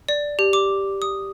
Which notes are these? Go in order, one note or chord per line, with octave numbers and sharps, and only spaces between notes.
D5
G4
D6
D#6